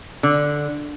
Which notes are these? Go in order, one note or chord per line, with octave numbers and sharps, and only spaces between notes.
D3